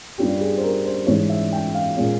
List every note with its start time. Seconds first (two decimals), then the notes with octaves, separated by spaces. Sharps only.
0.18 G2 G3 A#3 C#4 F4 G4
0.41 G#4
0.57 C5
0.63 A#4
0.85 C5
1.07 G#2 E3 G#3 C#4 E4 C#5
1.29 E5
1.52 G5
1.74 F5
1.97 A#2 G#3 C#4